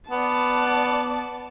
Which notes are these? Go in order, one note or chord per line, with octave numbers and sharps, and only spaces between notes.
B3 D5 A5